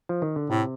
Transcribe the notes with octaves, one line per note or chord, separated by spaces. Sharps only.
F3
D#3
D3
A2 C3